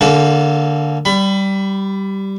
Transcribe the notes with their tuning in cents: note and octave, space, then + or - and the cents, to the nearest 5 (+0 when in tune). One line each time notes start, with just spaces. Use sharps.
D3 +0 A#3 -20 A4 -45
G3 -10 B5 +25